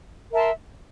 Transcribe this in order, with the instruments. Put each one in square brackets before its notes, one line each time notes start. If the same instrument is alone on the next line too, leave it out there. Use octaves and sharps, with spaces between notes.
[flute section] A#4 E5 A5 C6